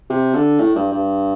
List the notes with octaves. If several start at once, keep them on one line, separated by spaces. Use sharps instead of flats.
C3
D3
A2
G2
G2